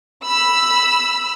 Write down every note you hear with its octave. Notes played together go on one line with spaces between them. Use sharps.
B5 E6